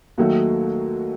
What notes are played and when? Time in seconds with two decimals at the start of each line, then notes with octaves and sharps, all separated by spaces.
0.18 D#2 D#3 F#3 A3 F#4